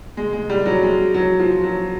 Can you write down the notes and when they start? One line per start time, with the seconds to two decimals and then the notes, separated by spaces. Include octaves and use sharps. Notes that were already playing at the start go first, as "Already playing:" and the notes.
0.17 G#3
0.33 G#3
0.49 G3
0.66 F#3
0.83 G#3
1.14 F#3
1.40 F3
1.64 F#3